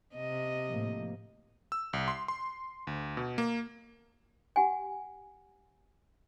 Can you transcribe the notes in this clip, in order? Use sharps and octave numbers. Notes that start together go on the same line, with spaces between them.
C3 D#5
A2 F3 A#3
E6
C2
C6
C6
D2
B2
A#3
G4 F#5 G#5